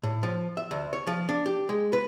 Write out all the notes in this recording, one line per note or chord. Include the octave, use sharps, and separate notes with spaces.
A2
F3
E5
D2
C#5
F3
D4
G4
G#3
B4